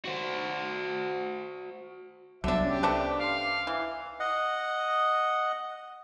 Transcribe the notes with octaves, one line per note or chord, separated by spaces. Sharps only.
F#4 C5
C2 D3 F#3 B3 D4 E5
C#4 G4
A3 D4 B4 C5
F5 C6 D6
E3
D#5 F#5